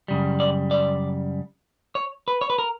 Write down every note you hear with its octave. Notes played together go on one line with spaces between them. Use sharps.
F#2 C#3 G3
D5
D5
C#5
B4
C#5
B4
A#4